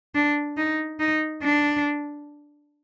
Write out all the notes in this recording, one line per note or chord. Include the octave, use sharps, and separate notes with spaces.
D4
D#4
D#4
D4